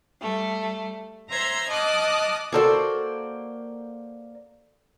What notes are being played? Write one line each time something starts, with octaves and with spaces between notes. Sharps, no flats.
G3 A3
C5 E5 A#5 C6 E6 G#6
D#5 A5 D6 D#6 F6 F#6
A#3 F#4 A4 C5 D5 D6